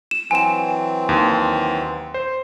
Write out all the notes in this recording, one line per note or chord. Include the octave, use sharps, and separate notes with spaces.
E7
E3 F#3 C4 G#5 E7
D#2
C5